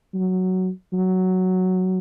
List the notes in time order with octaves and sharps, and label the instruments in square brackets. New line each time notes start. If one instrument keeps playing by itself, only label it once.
[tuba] F#3
F#3